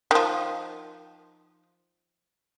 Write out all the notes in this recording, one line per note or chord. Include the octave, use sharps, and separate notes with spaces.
D#3 F3